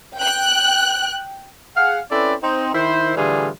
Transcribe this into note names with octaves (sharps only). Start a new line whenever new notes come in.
G5 F#6
G#4 F5 F#5
C4 C#4 E4 A4 B4 D5
C4 D#4
D#3 E4 C5
A2 D3 E3 G3 F4 G#4